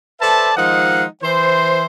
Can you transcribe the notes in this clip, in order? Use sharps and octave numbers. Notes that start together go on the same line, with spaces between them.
A4 B4 C5 D5 E5 A5
D#3 F3 G#3 D#4 F5 F#5
E3 C5